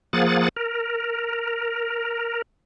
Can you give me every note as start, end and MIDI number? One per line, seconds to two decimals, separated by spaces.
0.13 0.49 53
0.13 0.49 58
0.13 0.49 68
0.13 0.49 78
0.13 0.49 93
0.56 2.42 70